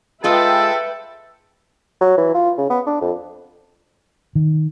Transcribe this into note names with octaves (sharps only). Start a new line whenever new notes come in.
G#3 F4 G#4 A4 B4 E5 G5
F#3
E3
F4
C#3
B3
D4
F2
D#3